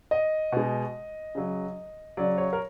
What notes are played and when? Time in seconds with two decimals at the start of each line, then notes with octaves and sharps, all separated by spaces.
0.11 D#5
0.52 B2 G#3
1.35 C#3 F#3
2.17 C#3 F#3 D5
2.38 C#5
2.53 A#4